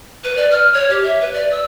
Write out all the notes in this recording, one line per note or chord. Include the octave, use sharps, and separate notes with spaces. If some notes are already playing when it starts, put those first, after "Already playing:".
B4
D5
F6
C#5
G4
E5
B4
D5
E6